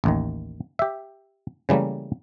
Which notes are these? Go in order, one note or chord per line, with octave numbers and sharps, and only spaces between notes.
A1 D#2 D#3
G4 E5
C#3 E3 G3 A3 A#3